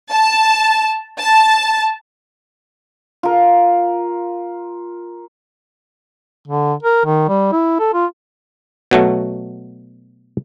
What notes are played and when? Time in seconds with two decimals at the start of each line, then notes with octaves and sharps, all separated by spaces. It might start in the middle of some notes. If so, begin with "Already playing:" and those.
0.12 A5
1.20 A5
3.23 F4 A#4
6.48 D3
6.83 A#4
7.06 D#3
7.29 G3
7.52 E4
7.80 A4
7.94 F4
8.91 B2 F#3 A3